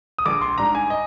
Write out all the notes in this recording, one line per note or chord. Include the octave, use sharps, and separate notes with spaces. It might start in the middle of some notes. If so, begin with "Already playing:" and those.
D#6
A#1 D6
C6
G#2 G3 D4 A#5
G#5
D#5